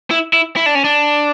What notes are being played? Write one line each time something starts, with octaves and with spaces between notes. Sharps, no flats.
E4
E4
E4
D4
C#4
D4